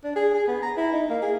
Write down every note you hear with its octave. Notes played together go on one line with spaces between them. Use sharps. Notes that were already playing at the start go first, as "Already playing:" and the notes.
D4
G#4
G#4
B3
A#5
E4
D#4
A#3
G#4